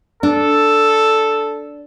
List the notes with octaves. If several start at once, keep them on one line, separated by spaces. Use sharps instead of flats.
D4 A4